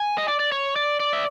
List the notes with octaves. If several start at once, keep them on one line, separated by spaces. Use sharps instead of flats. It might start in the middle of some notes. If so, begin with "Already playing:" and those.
Already playing: G#5
D#5
D5
D5
C#5
D5
D5
E5